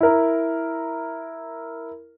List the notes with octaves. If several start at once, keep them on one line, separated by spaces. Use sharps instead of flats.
E4 A#4